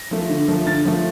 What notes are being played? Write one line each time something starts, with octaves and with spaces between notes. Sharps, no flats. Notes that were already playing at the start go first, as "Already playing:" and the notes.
Already playing: A#6
F3 A3
D3
F3 A3
D3 A6
F3 A3